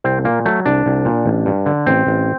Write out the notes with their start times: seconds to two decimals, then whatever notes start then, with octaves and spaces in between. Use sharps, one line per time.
0.04 C2 C4
0.24 A#2 A#3
0.46 F#3 A3
0.66 C2 D4
0.86 C2
1.05 A#2
1.26 A1
1.46 G2
1.66 D3
1.86 A1 C4
2.07 A1